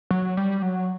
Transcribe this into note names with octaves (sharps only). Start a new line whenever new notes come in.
F#3
G3
F#3